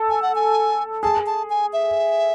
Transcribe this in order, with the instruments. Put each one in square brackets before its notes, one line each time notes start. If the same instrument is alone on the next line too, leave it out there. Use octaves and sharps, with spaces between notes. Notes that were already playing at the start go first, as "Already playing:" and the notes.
Already playing: [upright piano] A4
[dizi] G#5
F#5
G#5
[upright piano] G#4 [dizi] A5
[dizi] A5
G#5
E5